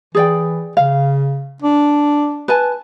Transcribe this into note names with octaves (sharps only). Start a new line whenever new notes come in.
E3 G#4 D5 G5
C#3 F5
D4
B4 G#5 A5